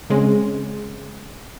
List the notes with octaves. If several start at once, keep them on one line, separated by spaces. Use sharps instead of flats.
C#3 G#3 C4 C#4